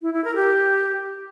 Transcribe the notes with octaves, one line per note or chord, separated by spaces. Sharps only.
E4
E4
A#4
G4